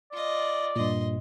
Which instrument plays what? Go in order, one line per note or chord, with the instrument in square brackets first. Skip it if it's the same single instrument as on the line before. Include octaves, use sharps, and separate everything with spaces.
[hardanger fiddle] F4 D#5 [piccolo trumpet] D5
[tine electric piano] G2 A#2 [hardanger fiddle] D#5 C6